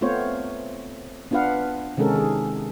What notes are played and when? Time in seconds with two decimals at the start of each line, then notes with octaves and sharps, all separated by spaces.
0.01 A3 B3 C4 F4 C5 C#5
1.31 B3 D4 F4 B4 F5 F#5
1.97 C3 D#3 G#3 C#4 A4 A#4
2.13 D#3 G#4